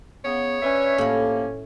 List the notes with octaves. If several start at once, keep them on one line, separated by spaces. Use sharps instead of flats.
C#3 B3 C#5
C#4 D4 B4 E5
A2 C3 F3 A#3 B5